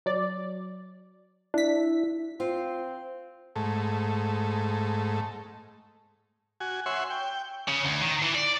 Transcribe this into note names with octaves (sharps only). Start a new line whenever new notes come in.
F#3 D5
D4 E4 B6
C4 F4
G#2 A3
F#4 G#5
C#5 E5 F#5 G#5 C6
G5
C#3
D2
D#3
E3
D5